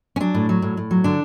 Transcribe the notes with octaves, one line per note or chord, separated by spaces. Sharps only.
C#4
F#3 D4
A2
F#3
A2
A2
F#3
D3 D4